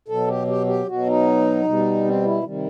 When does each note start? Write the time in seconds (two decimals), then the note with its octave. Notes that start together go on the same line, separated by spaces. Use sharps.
0.08 B2 F#3 A4
0.28 G4
0.47 G4
0.67 G4
0.87 B2 F#3 F#4
1.06 D#4
1.65 B2 G3
2.05 C4
2.24 E4
2.43 C3 D#3 G3